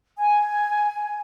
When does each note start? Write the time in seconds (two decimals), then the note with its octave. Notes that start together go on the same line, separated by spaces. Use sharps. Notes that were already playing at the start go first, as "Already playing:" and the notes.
0.17 G#5